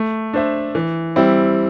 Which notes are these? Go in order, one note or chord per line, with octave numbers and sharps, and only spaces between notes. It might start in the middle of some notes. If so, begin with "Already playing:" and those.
Already playing: A3
D4 C5 E5
E3
G3 C4 E4